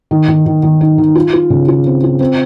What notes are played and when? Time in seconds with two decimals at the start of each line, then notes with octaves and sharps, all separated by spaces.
0.11 D#3
0.28 D#3
0.46 D#3
0.63 D#3
0.81 D#4
0.98 D#3
1.15 F4
1.33 F4
1.50 C#3
1.68 F4
1.86 C4
2.04 F4
2.20 C4